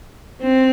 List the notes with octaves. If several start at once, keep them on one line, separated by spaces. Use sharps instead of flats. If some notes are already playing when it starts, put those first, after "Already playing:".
C4